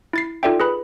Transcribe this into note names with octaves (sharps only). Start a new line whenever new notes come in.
E4 A6 C7
D#4 F4 A4 D5 E5 G5
G#4 B4 B5